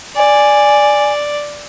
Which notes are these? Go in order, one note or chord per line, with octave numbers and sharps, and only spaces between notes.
D5 G#5